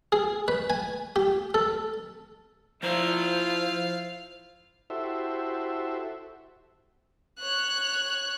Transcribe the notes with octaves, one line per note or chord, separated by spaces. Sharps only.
G#4
B4
G#5
G4
A4
F3 E4 F4 C5 F5 A#5
E4 F#4 G4 A4 C5 E5
C#5 F#6